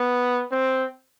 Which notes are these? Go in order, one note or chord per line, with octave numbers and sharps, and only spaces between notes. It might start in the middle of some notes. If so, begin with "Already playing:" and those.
Already playing: B3
C4